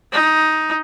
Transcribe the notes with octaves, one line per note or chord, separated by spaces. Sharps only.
D#4